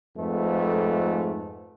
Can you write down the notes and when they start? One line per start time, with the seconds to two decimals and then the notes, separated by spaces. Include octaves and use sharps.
0.17 F2 G#2 A3 B4